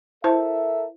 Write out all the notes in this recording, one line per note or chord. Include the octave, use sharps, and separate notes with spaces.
E4 A4 A#4 C5 E5 A5